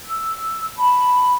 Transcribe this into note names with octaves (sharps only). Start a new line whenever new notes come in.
E6
A5 B5